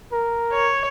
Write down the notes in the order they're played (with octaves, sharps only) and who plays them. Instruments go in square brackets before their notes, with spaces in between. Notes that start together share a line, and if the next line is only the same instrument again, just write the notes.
[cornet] A#4
[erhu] C#5